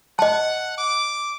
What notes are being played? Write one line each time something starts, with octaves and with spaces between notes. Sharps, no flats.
D#5 F#5 A5
D6